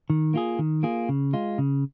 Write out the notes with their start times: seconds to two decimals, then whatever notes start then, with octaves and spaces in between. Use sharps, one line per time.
0.10 D#3
0.34 A#3 F4 G#4
0.59 D#3
0.83 A#3 F4 G#4
1.09 C#3
1.33 G#3 F4
1.58 C#3